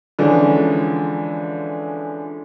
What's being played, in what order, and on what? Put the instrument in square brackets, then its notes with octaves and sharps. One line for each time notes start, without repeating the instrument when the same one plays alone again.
[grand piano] D3 E3 F3 G#3 C#4